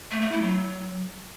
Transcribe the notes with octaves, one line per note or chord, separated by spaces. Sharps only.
A3
A3
E4
F#3